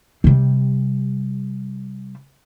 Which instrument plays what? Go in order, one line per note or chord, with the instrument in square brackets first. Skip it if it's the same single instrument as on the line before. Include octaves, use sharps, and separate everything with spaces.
[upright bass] C3 G3